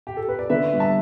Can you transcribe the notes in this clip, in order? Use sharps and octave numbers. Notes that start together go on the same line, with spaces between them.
G4
A4
B4
D5
D3 B4 E5
G3
E5 A5